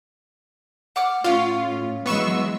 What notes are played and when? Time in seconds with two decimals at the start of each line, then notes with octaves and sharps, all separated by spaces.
0.96 F#5 D6 F6
1.24 A2 C#4 F4 F5
2.06 E3 F#3 G#3 B3 C#6 E6